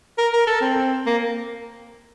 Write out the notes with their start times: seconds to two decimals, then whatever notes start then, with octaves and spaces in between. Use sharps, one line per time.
0.18 A#4
0.33 A#4
0.47 A4
0.62 C4
1.07 A#3